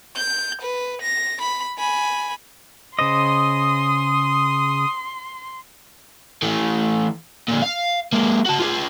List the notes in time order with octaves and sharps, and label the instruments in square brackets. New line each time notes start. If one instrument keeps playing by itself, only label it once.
[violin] G6
B4
A#6
B5
G#5 B5
[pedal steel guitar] C#3 C5 D#5 [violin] C6 [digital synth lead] D#6
[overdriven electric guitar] E3 A3
A#2 D3
F5
G#3 A#3
F#4 A5
F4 G#4